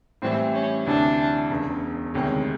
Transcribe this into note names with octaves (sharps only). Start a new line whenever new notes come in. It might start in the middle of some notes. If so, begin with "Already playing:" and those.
A2 E3 G3 C4
C#4
D2 C3 E3 D4
E1 E2 C#3
D2 C3 D#3 G#3 C#4